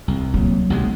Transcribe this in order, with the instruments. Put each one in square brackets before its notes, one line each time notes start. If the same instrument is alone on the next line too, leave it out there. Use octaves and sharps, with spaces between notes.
[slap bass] C2
[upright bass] F#3 A#3
[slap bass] B1 C3 G#3